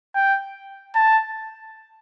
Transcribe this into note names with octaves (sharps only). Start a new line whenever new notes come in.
G5
A5